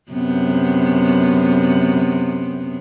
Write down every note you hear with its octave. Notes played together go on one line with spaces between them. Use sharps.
F#2 C3 B3